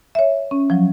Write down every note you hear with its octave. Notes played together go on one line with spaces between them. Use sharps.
C#5 E5
C#4
F3 F#3